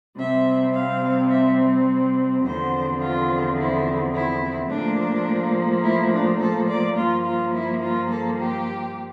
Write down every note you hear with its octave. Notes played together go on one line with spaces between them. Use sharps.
C3 G3 C4 E5
F5
E5
E2 D3 F3 C4 C5
F4
E4
E4
A2 F3 A#3 D4
E4
D4
A4
D5
G2 F3 A#3 F4
F4
E4
F4
A4
G4